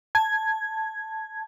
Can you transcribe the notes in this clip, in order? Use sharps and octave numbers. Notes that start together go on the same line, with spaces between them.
A5 G#6